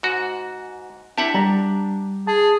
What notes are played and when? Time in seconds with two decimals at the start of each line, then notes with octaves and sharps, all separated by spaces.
0.03 G#2 F#4
1.18 D4 E4 G4 E5 F#5 A5
1.34 G3 D5 A#5
2.27 G#4 A5